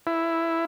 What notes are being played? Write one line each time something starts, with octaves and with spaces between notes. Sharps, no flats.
E4